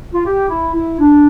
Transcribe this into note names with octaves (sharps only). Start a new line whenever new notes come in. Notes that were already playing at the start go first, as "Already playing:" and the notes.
F4
G4
E4
E4
D4